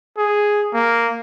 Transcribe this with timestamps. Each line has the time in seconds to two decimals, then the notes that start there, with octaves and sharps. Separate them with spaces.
0.18 G#4
0.74 A#3